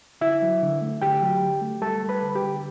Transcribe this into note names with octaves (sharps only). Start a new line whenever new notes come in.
D3 E4 E5
F#3
D3
A3
D3 G4 G5
F#3
D3
A3
G3 A4 A5
G3
B4 B5
D3
G4 G5
D3